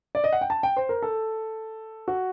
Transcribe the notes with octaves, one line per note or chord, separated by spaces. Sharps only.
D5
D#5
F#5
G5
A5
G5
C5
A#4
A4
F#4